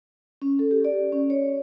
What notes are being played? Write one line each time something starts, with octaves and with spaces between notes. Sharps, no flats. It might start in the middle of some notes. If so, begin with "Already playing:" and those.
C#4
A4
G4
D5
C#4
C#5